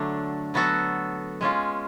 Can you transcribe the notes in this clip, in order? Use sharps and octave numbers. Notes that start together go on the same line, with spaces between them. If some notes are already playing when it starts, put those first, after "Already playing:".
Already playing: D3 F#3 A3 D4
F#3 B3 F#4 A4
G#3 C#4 F4